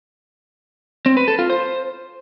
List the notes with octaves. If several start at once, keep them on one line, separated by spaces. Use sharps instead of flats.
C4
B4
A4
F4
C5